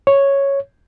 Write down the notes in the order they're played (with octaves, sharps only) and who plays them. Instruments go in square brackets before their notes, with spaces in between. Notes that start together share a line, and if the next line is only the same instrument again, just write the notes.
[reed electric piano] C#5